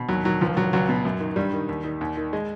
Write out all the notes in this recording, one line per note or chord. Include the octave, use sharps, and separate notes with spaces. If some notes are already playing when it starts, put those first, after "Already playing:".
Already playing: B2
D#2 F#3
D#3 F#3
C#2 F3
C#2 F#3
C#2 F#3
B2
F#2
D#3
G2 G3
D#3
D#2
D#3
D#2
D#3
G#3